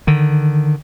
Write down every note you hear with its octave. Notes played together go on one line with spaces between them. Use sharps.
D3 D#3